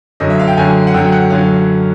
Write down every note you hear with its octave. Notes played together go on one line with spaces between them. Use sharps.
F#2 D3 F#3 D#5
E5
F5
G5
F#2 D3 F#3 G#5
F#5
F#2 D3 F#3 G5
G5
F#5
F#2 D3 F#3 F5